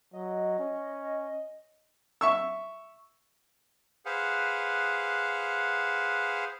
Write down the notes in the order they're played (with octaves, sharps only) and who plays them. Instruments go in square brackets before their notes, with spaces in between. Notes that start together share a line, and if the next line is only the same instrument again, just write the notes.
[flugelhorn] F#3 [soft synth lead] D#5
[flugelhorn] C#4
[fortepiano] E5 C#6 E6
[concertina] G#4 B4 C5 F5 F#5